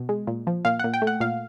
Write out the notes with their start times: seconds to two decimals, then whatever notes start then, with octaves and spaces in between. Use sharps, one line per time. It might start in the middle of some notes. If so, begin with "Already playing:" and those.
Already playing: B2
0.09 G#3
0.27 A#2
0.47 F3
0.65 A#2 F5
0.79 A#2 F#5
0.94 G5
1.02 A3
1.07 F#5
1.20 A#2 F5